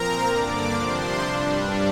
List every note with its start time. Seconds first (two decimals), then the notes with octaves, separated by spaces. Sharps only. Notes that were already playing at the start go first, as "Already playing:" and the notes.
Already playing: A#2 F3 C4 A#4 A#5
0.25 G2 D3 A#3 D4 D5 D6
0.73 C3 F3 D4 C5 C6
1.21 G2 G3 D4